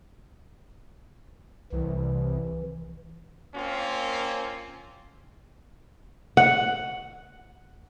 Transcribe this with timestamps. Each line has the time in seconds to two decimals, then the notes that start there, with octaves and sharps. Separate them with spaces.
1.73 C2 E3
3.54 A#3 C4 C#4 F4
6.37 F#5